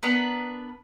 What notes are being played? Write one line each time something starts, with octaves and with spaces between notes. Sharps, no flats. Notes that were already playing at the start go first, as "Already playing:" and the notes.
B3 D4 A#4 B4